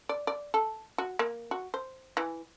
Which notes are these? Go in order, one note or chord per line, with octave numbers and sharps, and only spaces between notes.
D5
D5
A4
F#4
A#3
F#4
C5
E3